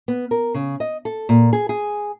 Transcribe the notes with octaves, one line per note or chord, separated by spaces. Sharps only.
B3
A#4
C#3
D#5
A4
A#2
G#4
G#4